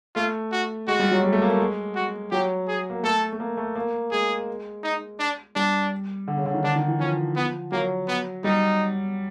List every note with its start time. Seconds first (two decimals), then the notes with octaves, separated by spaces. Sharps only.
0.15 A3 F4
0.52 F#4
0.88 G#3 F#4
1.00 G3
1.11 F#3
1.24 G3
1.33 A3
1.42 A#3
1.50 A3
1.60 G#3
1.95 F#4
2.31 F#3 G4
2.68 G#4
2.90 A#3
3.03 A3 A4
3.33 A3
3.40 A#3
3.57 A3
3.75 A#3
4.12 G#3 G#4
4.83 D#4
5.19 D4
5.56 G3 D4
6.28 D3
6.37 C#3
6.46 D3
6.54 D#3
6.64 D3 D4
6.76 D#3
6.88 E3
6.99 F3 C#4
7.36 B3
7.72 F#3 A#3
8.08 B3
8.44 G3 D#4